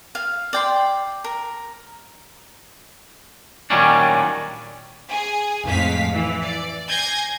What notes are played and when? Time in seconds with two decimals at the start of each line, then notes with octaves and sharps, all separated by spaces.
0.15 F5
0.53 D5 G5 C6
1.24 A#4
3.70 A#2 D#3 F#3 G3 C#4 D4
5.10 G#4
5.64 F2 A2 G#3 F5 B6
6.11 E3
6.42 D5
6.89 G#5 G6 G#6 A#6 C7